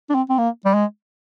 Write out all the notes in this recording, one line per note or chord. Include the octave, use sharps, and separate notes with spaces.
D4
C4
C4
A#3
G3
G#3